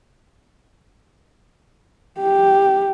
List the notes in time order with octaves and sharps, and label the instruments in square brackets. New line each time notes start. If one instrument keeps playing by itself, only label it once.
[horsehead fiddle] G4